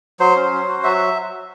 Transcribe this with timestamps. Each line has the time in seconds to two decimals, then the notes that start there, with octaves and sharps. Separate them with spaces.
0.20 F#3 C5
0.36 C#4
0.53 F#3
0.68 F#4
0.84 F#3 E5